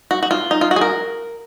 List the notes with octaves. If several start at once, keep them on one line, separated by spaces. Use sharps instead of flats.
F#4
F#4
F4
D#4
F4
F#4
G#4
A#4